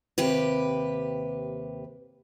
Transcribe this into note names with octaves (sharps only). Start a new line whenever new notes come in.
D#2 C3 G4 B4